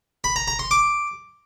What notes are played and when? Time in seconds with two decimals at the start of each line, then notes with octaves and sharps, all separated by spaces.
0.24 B5
0.36 A#5
0.48 A#5
0.59 C6
0.71 D6